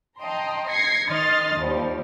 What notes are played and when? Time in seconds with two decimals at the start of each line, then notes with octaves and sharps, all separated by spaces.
0.19 D#5 G5 A5 A#5 C6
0.68 G#6 A#6 C7 C#7
1.08 D#3 D#5 C6 D#6 F6 A6
1.57 D#2 F3 G3